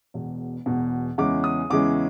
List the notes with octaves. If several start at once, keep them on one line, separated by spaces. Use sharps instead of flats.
E1 E2 B2
E1 E2 B2
E2 C#3 E3 G#3 C#4 D6
D#6
E2 C#3 E3 G#3 C#4 D6